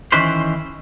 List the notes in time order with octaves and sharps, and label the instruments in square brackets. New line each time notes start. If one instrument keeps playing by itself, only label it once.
[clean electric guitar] D#3 E3 C#4 B4 C5